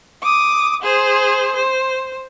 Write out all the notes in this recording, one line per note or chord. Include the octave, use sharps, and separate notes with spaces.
D6 D#6
G#4 C5
C5